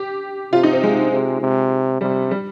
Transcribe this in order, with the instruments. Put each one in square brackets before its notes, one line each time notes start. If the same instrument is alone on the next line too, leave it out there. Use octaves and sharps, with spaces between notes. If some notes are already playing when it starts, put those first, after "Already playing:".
Already playing: [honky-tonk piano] G4
[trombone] C3 [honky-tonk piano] F4
[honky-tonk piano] D#4
C4
G#3
[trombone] C3
C3
[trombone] C3 [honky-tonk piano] G3
[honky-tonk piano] G3